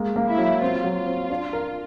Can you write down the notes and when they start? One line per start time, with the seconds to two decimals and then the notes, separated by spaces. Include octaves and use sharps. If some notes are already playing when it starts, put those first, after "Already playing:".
Already playing: G#3 A#3
0.16 A#3
0.27 E4
0.38 F#3
0.61 C4 F4
0.84 F#3
0.96 F4
1.06 C4
1.30 D4
1.53 A#4